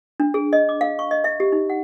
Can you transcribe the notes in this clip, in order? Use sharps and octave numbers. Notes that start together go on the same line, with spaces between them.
D4
G#4
D#5
D6
F5
C#6
D#5
E5
G4
D#4
F#5